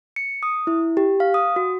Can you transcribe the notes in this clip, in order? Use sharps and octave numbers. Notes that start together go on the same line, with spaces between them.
C#7
D#6
E4
G4
F5
D#6
F#4